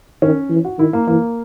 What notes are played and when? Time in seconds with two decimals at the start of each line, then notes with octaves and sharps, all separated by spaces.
0.22 D#3 C#4
0.50 E3
0.65 F#4
0.78 D#3 E4
0.93 A#3
1.07 E3 A#3